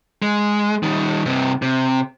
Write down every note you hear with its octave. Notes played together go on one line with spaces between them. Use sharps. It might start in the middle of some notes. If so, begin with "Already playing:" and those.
G#3
D#3 G3
G2 C3
C3